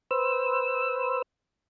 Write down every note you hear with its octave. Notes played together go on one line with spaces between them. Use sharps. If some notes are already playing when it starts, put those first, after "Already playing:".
B4 C5 E6